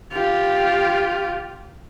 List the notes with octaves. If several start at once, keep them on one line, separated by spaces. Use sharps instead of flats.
F4 G4